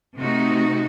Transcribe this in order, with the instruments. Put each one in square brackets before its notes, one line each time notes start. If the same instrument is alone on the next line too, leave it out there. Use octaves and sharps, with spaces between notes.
[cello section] C3 A3 D#4 F#4